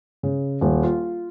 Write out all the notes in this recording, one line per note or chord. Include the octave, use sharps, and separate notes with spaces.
C#3
D#1
F4